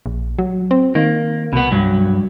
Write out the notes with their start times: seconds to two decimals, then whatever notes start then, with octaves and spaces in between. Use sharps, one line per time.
0.06 A#1
0.39 F#3
0.71 C4
0.95 D#3 A#3
1.53 C2 B2 B3
1.72 G2 F#3